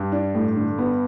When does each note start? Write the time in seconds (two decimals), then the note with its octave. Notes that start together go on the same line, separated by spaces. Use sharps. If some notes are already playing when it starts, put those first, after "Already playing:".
Already playing: G2
0.12 D4
0.35 A2
0.57 D3
0.78 B3